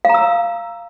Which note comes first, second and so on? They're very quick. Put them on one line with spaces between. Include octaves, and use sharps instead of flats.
F5 A#5 E6